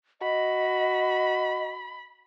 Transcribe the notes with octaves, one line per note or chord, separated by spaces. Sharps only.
F#4 D#5 B5